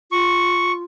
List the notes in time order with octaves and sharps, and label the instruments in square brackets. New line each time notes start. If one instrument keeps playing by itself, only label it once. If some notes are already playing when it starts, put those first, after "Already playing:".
[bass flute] F4 [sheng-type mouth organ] C#6